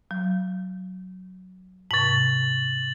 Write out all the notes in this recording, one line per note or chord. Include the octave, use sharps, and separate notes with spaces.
F#3
G#2 C3 A6 F#7